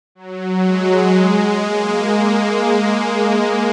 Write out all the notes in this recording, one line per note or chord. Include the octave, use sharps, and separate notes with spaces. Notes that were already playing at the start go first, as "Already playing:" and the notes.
F#3
G#3
A#3